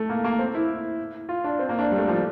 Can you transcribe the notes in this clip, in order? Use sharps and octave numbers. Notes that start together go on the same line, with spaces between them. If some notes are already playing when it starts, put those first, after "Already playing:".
Already playing: A3
A#3
A#3
C4
E4
F4
D4
C4
A#3
D4
G3
A3
F3